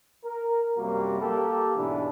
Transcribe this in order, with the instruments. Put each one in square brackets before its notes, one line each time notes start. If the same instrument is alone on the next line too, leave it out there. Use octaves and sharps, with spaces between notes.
[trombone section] A#4
F#2 C3 G3 A#3 F#4 A#4
A#3 G4 A4
B1 G#2 B2 E3 D4